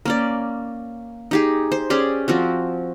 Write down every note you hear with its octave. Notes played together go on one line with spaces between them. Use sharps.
A#3 C#4 D5
D#4 G4 G#4
C5
C#4 G4 G#4 D5
F3 C4 F#4